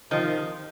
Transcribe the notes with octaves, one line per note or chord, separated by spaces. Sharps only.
C3 D#3 F3